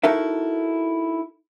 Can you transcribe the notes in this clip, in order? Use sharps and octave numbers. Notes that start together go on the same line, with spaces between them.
D#4 E4 F#4 A4 A#4 E5